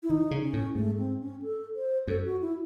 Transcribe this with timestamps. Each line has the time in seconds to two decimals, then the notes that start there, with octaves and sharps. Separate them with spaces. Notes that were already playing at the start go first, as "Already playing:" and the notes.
0.03 E4
0.09 D#3 D#4
0.31 C#3
0.42 C#4
0.53 A2
0.75 G#2 A3
0.98 C4
1.20 C#4
1.42 A4
1.75 C5
2.07 F#2 A4
2.25 F#4
2.41 E4